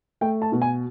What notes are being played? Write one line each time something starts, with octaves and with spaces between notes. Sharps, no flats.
A3 G5
A5
B2
G#5